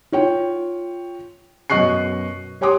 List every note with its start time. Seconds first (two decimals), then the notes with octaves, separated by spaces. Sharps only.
0.12 F4 C#5 G5
1.70 F#2 B2 D#5 C#6 F#6 C7
2.61 G4 C#5 G#5 C6 D6 D#6